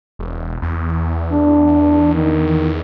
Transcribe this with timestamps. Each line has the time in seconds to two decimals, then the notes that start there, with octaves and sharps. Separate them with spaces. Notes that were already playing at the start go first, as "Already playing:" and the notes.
0.19 E1
0.62 E2
1.32 D4
2.15 D#3